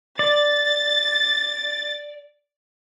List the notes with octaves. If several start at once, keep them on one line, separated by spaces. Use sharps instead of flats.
D5 A6